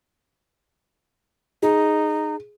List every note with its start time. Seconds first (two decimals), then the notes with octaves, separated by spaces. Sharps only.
1.62 D#4 G#4